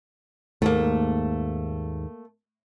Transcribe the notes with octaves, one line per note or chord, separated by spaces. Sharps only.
D#2 G#2 A3 A#3